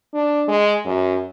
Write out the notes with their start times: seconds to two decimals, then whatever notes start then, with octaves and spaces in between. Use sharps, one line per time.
0.14 D4
0.48 G#3
0.85 F#2